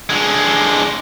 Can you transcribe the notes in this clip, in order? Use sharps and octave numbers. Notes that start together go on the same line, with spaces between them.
D3 G#3